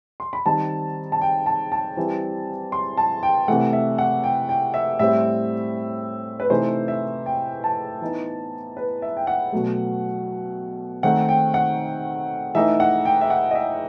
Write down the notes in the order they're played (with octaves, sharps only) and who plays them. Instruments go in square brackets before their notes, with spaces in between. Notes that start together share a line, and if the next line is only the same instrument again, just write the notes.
[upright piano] C6
B5
D#3 G3 C4 D#4 A5
A5
G5
A5
A5
E3 G3 C4
C6
A5
G5
C3 E3 A3 F#5
E5
F#5
G5
G5
E5
A2 G3 C4 E5
B4
C3 E3 A3 D#4 C5
E5
G5
A5
E3 B3 D#4
B4
E5
G5
F#5
B2 F#3 A3
D#3 A3 C4 D#4 F#5
G5
F#5
E3 A3 D#4 E5
F#5
G5
E5
F#5
D#5
E5